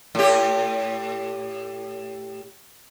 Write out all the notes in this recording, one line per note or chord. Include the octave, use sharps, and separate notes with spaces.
A2 G4